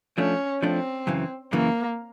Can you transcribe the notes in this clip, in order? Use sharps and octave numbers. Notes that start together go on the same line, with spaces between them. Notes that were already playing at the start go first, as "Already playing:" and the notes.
F3 A3 C#4 D4
F3 A3 C4 D4
F#2 C#3 E3
F#2 C#3 E3 A#3